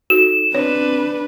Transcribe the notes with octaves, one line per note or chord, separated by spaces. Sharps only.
D#4 F#4 A4 E7
C4 D4 B4 C#5